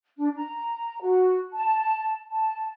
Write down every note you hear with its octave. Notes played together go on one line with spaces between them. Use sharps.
D4
A#5
F#4
A5
A5